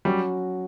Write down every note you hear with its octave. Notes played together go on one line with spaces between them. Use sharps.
F#3 G3 C#4 F#4